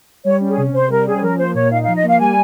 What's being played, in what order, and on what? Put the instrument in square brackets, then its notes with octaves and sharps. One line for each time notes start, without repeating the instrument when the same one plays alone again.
[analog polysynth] G3 [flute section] C#5
[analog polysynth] C#4
[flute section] G#4
[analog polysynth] C3
[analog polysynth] C3 [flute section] C5
[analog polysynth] G3 [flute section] A#4
[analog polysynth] C#4 [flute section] G#4
[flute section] C5
[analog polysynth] F3 [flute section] A#4
[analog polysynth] A#3 [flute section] C5
[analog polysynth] A#2 [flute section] C#5
[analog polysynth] D#4 [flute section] F5
[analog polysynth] F3 [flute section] F5
[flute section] D#5
[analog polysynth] A#3 [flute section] F5
[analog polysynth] G3 [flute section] G#5